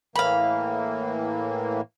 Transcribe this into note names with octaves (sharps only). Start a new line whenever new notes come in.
A2 E3 A#3 F5 B5